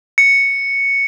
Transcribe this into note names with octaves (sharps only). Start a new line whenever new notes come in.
C#7